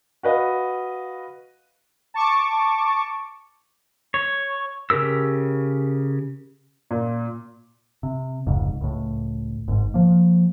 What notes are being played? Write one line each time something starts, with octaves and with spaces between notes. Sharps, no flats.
F#4 B4 D#5 F5
A5 C#6 D6
C#5
C#3 G4 A#4 E6
A#2
C3
F1 C#2 G#2
C#2 A2
G#1 G#2
F3 A#3